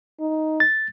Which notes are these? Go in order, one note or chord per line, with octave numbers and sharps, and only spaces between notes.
D#4
A6